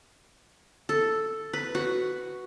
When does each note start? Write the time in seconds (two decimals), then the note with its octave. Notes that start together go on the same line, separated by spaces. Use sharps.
0.89 A4
1.53 B4
1.75 F#4